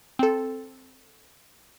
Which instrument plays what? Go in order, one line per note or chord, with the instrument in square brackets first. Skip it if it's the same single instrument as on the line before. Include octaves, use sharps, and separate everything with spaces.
[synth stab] C4 A4